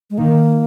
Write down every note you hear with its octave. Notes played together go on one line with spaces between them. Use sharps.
G#3
D#3 A#3